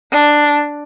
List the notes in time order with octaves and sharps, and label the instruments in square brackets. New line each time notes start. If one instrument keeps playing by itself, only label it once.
[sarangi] D4